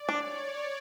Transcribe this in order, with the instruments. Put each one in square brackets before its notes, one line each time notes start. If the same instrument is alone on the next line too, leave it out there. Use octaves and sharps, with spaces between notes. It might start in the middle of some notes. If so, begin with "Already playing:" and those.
Already playing: [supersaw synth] D5
[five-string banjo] D4 [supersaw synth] C#5